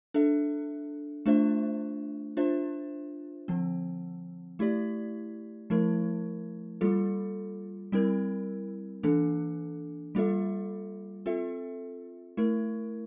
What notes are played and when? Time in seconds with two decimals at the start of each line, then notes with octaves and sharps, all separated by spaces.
0.14 D4 A4 E5
1.26 A3 D4 F4 C5 E5
2.37 D4 F4 C5 E5
3.48 D3 F3 C4
4.59 A3 E4 G4 D5
5.70 F3 A3 E4 A#4
6.81 G3 A#3 F4 A4
7.92 G3 C4 E4 A#4
9.03 E3 A#3 D4 A4
10.15 G3 A#3 F4 A4 E5
11.26 C4 F4 A4 E5
12.37 A3 E4 A#4